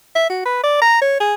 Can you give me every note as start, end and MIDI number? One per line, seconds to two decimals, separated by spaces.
0.15 0.29 76
0.30 0.41 66
0.45 0.62 71
0.63 0.78 74
0.81 0.99 82
1.01 1.19 73
1.20 1.34 68